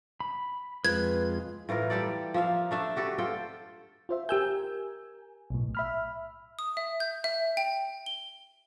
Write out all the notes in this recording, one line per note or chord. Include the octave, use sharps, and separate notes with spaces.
B5
F2 G#3 F4 B4 F#6 G#6
A2 E3 F4 A#4
G3 G4 A4 D5
F3 A#3 E5 F5
A3 D4 E5
F#4 G4 A4 B4
F4 A4 C5 G5
F4 C5 E5
G4 A#4 G#5 E6 G6
B1 A2
E5 B5 F6
D#6
E5
G6
E5
G5
G7